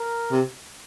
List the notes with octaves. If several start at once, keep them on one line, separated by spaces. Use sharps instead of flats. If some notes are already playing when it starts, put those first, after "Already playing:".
Already playing: A#4
C3